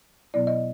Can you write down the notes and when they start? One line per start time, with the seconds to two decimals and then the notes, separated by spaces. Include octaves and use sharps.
0.34 B2 F#3 B3 E4 D5
0.47 D#5